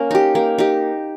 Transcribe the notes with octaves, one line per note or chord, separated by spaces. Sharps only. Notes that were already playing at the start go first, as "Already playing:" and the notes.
Already playing: A#3 C#4
D#4 G4
A#3
D#4 G4